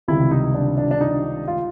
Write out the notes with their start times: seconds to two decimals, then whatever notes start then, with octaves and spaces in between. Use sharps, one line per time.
0.08 C#2 C3 D#3 G3 E4
0.31 D#4
0.54 D4
0.78 D4
0.91 D4
1.01 D#4
1.48 F4